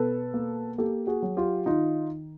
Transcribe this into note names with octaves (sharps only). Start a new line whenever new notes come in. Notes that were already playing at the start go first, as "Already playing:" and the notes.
Already playing: B2 A4 B4
A#3
A#3 G4 A4
F#4 G#4
F#3
F4 G4
D#3 D#4 F4